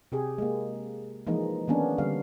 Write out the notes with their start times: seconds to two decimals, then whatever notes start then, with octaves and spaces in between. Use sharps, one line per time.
0.12 C3 G4 G#4
0.38 G#3 A#3
1.27 E3 F3 G#3 A#3 D#4
1.68 D#3 E3 A#3 B3 C#4 D4
1.98 D3 G3 F5